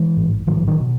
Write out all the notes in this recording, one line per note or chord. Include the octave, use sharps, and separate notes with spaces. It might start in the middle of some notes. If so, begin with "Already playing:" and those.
Already playing: E3 G#3
A1 G#2
A1 G#2 D#3 F#3
E3
D#3 F#3
B2